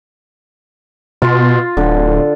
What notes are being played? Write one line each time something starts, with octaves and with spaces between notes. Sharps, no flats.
B2 F4 C6
D1 D3